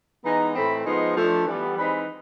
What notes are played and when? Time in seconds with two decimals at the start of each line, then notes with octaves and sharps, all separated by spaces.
0.25 E3 G#3 B3 D#4 A#5
0.55 A2 E3 A3 C4 B5
0.85 F3 G#3 B3 D#4 C6
1.16 F3 A3 D4
1.46 E3 G3 B3
1.77 E3 G#3 C4 D#4 B5